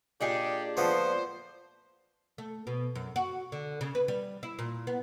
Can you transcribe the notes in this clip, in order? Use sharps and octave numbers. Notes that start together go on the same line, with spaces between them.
A#2 D4 D#4 G4 G#4
F3 A3 B3 C5 D5
A3
B2
F#2
F#4
D3
C#3
B4
G3
E4
A#2
B3